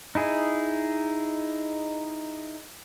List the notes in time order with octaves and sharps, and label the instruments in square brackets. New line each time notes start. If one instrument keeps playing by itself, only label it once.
[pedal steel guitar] D#4 E4 G#4